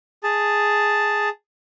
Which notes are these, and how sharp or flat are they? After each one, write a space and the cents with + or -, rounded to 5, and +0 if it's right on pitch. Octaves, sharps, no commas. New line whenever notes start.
G#4 +0 A5 +0